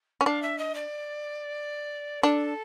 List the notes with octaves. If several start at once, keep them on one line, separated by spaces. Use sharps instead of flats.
C#4
D4 F5
E5
D#5
D5
D4 A4